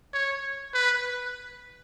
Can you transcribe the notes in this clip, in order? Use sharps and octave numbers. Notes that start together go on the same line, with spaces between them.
C#5
B4